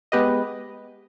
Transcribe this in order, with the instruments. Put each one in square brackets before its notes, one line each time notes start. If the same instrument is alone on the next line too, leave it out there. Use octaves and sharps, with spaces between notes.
[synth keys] G#3 B3 G4 B4 D#5